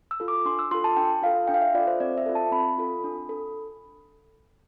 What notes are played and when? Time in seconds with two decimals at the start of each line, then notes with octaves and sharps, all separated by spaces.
0.11 E6
0.20 F4 A4
0.28 D6
0.45 D4 C6
0.59 E6
0.71 F4 A4 C6
0.84 A5
0.97 D4 G5
1.22 F4 A4 F5
1.48 D4 G5
1.54 F5
1.61 E5
1.74 F4 D5
1.79 A4
1.87 C5
2.00 C4 D5
2.18 E5
2.26 F4 A4
2.35 A5
2.52 C4 B5
2.78 F4 A4
3.04 D4
3.29 A4